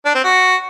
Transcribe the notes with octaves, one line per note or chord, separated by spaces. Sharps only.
D4
C4
F#4